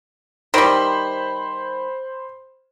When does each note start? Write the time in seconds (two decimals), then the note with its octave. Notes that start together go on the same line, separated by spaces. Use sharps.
0.54 D#3 G3 C5 B5 C6